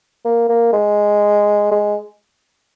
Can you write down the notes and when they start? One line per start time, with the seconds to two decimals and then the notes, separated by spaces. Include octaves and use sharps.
0.25 A#3
0.49 A#3
0.73 G#3
1.71 G#3